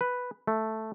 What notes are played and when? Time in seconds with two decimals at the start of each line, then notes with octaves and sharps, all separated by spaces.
0.01 B4
0.47 A3